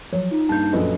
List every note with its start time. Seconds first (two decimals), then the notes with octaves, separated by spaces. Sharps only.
0.13 F3 F#3 C#5
0.31 D#4 F4
0.49 G2 A#3 A5 G6
0.73 A#1 F#2 F3 A4 B4 D#5